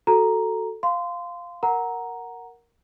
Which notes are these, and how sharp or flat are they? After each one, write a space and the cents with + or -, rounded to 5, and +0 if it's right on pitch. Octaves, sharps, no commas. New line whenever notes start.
F#4 +0 A4 +0 A#5 +0
F5 +0 C6 -20
A#4 +0 F#5 +0 A#5 +0